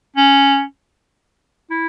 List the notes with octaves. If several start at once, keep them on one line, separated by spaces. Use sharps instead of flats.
C#4
E4